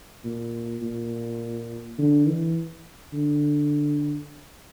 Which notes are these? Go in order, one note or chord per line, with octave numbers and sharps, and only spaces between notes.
A#2
A#2
D3
E3
D3